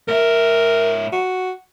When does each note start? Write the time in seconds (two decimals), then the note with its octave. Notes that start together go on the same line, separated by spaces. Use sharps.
0.08 G#2 A#4 E5
1.13 F#4